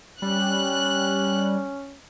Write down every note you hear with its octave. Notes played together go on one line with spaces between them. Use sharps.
G3 C#4 F#6